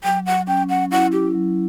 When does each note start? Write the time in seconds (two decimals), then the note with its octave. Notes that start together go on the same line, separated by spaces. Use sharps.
0.04 F#3 G5
0.26 F#5
0.47 C#4 G5
0.69 F#5
0.91 E4 F#5
1.12 G4
1.34 F#3